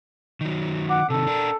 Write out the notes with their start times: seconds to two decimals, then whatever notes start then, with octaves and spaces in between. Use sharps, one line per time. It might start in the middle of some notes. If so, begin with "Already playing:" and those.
0.41 D#3 F#3
0.90 F#5 D6
1.10 C3 D#3 A4
1.27 D4 A#4